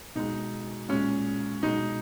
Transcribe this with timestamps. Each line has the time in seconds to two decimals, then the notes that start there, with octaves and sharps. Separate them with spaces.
0.15 B2 G#3 D#4
0.89 A#2 G#3 C#4
1.63 B2 G#3 D#4